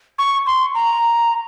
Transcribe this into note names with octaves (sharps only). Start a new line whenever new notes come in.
C#6
C6
A#5